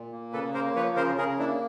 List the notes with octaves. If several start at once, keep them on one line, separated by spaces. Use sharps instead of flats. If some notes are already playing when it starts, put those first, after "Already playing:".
Already playing: A#2
A#3
C#3 A4 B4
A#3 A#4 C5
F3 B4 C#5
C#3 A#4 C5
C#3 G#4 A#4
A#3 D4 E4